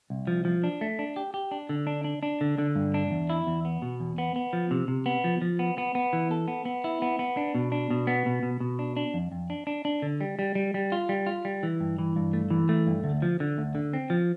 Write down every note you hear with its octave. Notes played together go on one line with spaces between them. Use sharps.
C2
F3
F3
D4
A3
D4
G4
G4
D4
D3
D4
D4
D4
D3
D3
G2
D4
E2
E4
E2
B3
B2
E2
B3
B3
F3
C3
C3
B3
F3
F3
B3
B3
B3
E3
A4
B3
B3
E4
B3
B3
D4
B2
D4
B2
B3
B2
B2
B2
D4
D4
F2
F2
D4
D4
D4
D3
G3
G3
G3
G3
F4
G3
F4
G3
E3
G2
E3
G2
A3
E3
A3
G2
D2
F3
D3
D2
D3
C4
F3